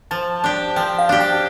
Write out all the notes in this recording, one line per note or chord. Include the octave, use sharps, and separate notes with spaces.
F3 A5
D4 G4
F3 G5
F5
D4 G4
G5